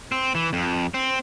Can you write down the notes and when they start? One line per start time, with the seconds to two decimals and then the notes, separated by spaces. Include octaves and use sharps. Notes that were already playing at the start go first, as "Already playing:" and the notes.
0.12 C4
0.35 E3
0.53 F2
0.94 C4